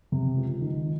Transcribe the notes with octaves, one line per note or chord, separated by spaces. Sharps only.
C3
C#2
D#3